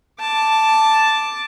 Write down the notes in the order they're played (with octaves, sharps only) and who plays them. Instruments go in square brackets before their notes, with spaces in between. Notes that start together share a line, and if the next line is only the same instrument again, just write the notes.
[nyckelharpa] A5 D6